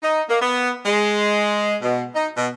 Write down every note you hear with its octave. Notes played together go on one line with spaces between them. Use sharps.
D#4
A#3
B3
G#3
B2
D#4
B2